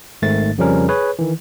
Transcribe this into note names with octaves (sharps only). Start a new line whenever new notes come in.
G#1 G#2 D#3 A3 A6
F2 C#3 F3 G3 C#4 A#4
G#4 B4 C#5
D#3 E3